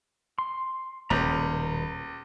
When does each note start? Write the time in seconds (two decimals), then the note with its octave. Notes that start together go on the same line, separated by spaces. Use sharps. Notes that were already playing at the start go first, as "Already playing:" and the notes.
0.39 C6
1.10 D#1 C#2 B2 A#5 B5 G6